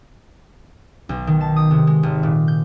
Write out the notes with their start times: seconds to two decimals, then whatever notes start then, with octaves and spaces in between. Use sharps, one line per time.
1.09 B1
1.27 D#3
1.41 A5
1.56 D#6
1.71 C3
1.87 G#3
2.03 G#1
2.23 A#2
2.48 G6